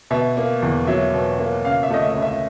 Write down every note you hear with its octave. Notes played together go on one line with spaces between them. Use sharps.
B2 E5
A#3
E2
F#3 E5
B2
A#3
C#3 F5
E5
A3 D#5
E5
C#2
E5